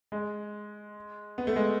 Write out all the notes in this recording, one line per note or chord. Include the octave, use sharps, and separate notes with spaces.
G#3
B3
A3
G#3